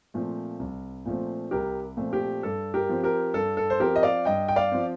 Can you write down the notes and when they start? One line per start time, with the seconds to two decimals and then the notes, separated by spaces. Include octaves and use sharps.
0.14 A#2 F3 A3 C4
0.60 C2
1.05 A#2 F3 A3 C4
1.51 C2 G4 A#4
1.97 A#2 F3 A3 C4
2.13 G4
2.43 G2 A4
2.74 G4 A#4
2.89 F3 C4
3.04 G4 A#4
3.34 G2 A4
3.57 A4
3.70 C5
3.80 F3 C4 G4 A#4
3.96 D#5
4.03 D5 F5
4.25 G2 D#5 G5
4.48 G5
4.56 D5 F5
4.72 F3 C4